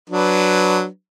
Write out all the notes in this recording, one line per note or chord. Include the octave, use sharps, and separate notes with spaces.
F#3 D4 B4